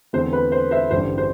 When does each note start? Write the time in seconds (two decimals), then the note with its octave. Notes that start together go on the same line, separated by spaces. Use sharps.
0.13 E2 D3 A3 C4 C5
0.33 B4
0.52 C5
0.71 C5 E5
0.91 A1 G2 D3 C5
1.18 C5